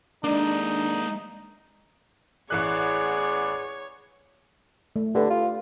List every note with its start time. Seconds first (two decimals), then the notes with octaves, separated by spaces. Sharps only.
0.24 G#3 A#3 D4 D#4
2.50 A1 E3 B3 G#4 C#5 D5 F#6
4.96 A3
5.15 D3 G4 A4 B4
5.30 F4